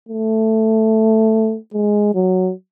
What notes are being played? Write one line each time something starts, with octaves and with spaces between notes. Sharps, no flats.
A3
G#3
F#3